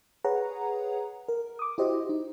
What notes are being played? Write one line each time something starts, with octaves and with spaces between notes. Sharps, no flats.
G#4 B4 C#5 F#5 A#5
A#4
D6 D#6
E4 F#4 G4 C5 D#5
D#4